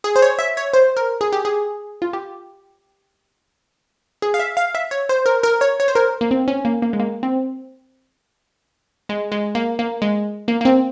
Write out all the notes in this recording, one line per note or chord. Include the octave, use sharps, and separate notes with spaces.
G#4
C5
C#5
E5
C#5
C5
A#4
G#4
G4
G#4
F4
G4
G#4
F5
E5
F5
E5
C#5
C5
A#4
A#4
C#5
C#5
C5
A#4
A#3
C4
C#4
A#3
A#3
G#3
A#3
C4
G#3
G#3
A#3
A#3
G#3
A#3
A#3
C4